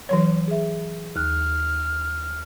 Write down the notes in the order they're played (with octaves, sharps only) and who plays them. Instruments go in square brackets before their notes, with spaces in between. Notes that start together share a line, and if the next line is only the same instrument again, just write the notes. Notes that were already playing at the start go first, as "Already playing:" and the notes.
[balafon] E3 F#3 C#5
[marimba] G#4 E5
[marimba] D#2 F#6 [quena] F6